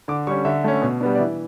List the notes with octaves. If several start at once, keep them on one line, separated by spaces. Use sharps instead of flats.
D3 D6
G3 C#4 C#6
D3 E5
A3 C#4
B2
G3 B3 D4
D5
E3 E5